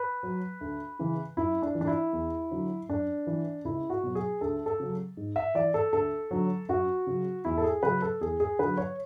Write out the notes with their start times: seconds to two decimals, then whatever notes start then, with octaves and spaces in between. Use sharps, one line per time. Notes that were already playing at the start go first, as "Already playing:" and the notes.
Already playing: B4
0.23 F#3
0.61 D2
0.99 C#3 E3
1.37 F#2 E4
1.62 D4
1.75 E3
1.81 D4
1.87 E4
2.13 E2
2.51 D3 F#3
2.89 F#2 D4
3.27 E3
3.65 C#2 E4
3.90 F#4
4.03 B2 F#3
4.15 G#4
4.41 D2 A4
4.66 A4
4.80 C#3 F#3
5.17 G#2
5.36 E5
5.54 E3 D5
5.74 A4
5.93 D2 A4
6.31 D3 F#3
6.69 F#2 F#4
7.07 C#3 F#3
7.45 E2 E4
7.58 A4
7.64 G#4
7.83 C#3 F#3 B4
8.02 A4
8.21 E2 G#4
8.40 G#4
8.59 D3 F#3 B4
8.78 C#5